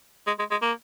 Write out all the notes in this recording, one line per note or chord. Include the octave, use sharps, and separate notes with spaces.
G#3
G#3
G#3
A#3